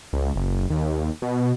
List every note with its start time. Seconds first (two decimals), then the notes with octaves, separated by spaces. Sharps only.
0.13 C#2
0.36 F#1
0.70 D#2
1.22 B2